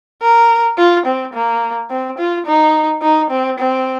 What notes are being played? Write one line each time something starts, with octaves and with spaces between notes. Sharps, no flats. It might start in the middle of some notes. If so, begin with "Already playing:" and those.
A#4
F4
C4
A#3
C4
F4
D#4
D#4
C4
C4